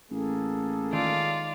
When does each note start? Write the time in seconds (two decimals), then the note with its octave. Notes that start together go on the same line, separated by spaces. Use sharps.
0.11 A1 A#3 G#4 A4
0.92 D#3 G#3 F4 D5 D7